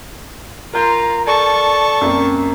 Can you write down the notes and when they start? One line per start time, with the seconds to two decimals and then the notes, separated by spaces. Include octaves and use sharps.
0.73 F4 A#4 A#5 G6
1.27 A4 D5 A5 C#6
2.01 F#2 A#3 C4